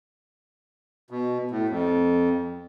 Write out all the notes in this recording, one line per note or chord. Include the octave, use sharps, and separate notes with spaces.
B2
A2
F2